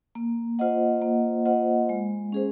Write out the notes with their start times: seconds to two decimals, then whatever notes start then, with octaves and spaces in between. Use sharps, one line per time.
0.15 A#3
0.59 F4 C5 D#5 F#5
1.02 A#3
1.46 F4 C5 D#5 F#5
1.89 G#3
2.32 C#4 G#4 C5